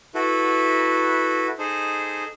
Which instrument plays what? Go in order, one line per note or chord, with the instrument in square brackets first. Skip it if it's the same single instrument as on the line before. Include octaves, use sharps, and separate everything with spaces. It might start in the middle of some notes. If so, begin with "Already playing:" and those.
[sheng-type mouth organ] E4 F#4 A4 B4
D#4 G#4 A4 C5